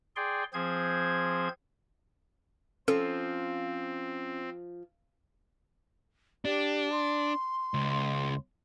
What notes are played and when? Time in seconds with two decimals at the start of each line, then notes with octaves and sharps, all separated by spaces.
0.16 G#4 D5 G5 C6
0.53 F3 C4 G#4 C5 G#6
2.88 F3 C4 C#4 A4
6.45 D4 G4
6.92 C6
7.74 C#2